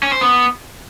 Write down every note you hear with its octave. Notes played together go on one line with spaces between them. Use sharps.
C#4
C5
B3